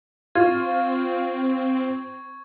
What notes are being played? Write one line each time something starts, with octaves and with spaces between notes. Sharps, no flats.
C4 F4 C#6 G#6